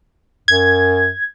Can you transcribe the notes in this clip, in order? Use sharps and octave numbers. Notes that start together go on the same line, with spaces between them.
F#2 G#6